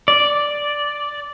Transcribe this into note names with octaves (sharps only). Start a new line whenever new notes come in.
D5